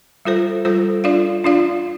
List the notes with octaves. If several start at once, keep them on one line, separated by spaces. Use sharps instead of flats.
G3 F4 A4 C5
G3 F4 A4 C5
D4 F4 D5 F5
D4 F4 D5 F5